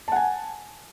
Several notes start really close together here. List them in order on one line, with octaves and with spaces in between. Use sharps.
A5 F#5 G#5